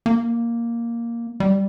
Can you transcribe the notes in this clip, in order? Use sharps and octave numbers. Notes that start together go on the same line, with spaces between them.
A#3
G3